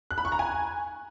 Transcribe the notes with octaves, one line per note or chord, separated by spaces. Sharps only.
F#6
B5
C#6
A#5
G#5